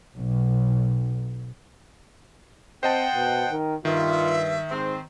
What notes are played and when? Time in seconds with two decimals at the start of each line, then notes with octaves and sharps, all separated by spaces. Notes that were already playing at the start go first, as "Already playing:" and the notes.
0.16 B1
2.83 C4 C5 D#5 F#5 G5 A5
3.14 B2
3.51 D#3
3.85 G2 D#3 F4 E5
4.70 G#2 C4